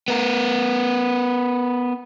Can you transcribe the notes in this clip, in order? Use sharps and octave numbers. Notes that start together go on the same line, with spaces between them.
B3 A#4